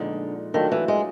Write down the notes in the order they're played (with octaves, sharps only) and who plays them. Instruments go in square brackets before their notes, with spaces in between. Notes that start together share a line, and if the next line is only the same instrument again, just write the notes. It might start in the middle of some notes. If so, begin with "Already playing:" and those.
Already playing: [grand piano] A#2 F3 G#3 B3 D#4 [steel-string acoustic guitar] D3
[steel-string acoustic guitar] D#3 [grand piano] F#3 A3 D4 F4 A4
[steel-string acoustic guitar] E3
G#3